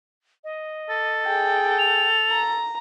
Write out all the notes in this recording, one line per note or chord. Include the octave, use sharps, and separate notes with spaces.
D#5
A4
G#4 G5
F7
A#5